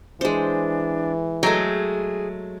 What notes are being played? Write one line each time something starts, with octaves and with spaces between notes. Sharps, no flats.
E3 G#3 D4 C5
F#3 G#3 A3 G#4 G5